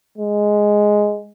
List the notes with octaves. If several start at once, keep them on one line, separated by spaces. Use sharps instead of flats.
G#3